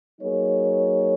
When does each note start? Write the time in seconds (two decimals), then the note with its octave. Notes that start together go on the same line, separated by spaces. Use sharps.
0.22 F#3 A#3 D#4 G#4 C#5